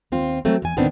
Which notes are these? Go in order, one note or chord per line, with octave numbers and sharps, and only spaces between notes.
D#2 C4 F4
F#3 A3 C4
E2 G#5
D2 A2 D#3 B3 C4 D4